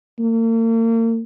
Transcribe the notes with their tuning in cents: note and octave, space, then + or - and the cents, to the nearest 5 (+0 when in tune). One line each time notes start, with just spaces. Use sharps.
A#3 -40